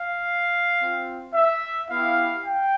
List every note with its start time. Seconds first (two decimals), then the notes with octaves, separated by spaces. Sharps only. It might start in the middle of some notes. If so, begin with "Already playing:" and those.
Already playing: F5
0.80 C4 F4
1.34 E5
1.89 B3 E4 G4 F5
2.43 G5